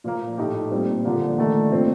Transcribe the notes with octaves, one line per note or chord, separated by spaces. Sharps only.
A#2 F3 A#3
A2 A3 D#4 G4
A#2 G3 C4
D3 F3 A#3 D4
D#3 A3 D4
A#2 F3 C4